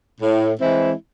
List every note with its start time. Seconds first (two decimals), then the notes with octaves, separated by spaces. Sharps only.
0.21 A2
0.61 E3 G#3 C4 E4